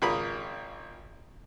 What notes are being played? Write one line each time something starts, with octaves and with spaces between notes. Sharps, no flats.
G#1 C#3 F4 A#4 B5 D#6